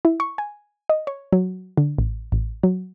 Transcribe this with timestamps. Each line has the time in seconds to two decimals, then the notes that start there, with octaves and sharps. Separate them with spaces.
0.05 E4
0.20 C#6
0.38 G#5
0.90 D#5
1.07 C#5
1.33 F#3
1.78 D3
1.98 A1
2.32 A1
2.63 F#3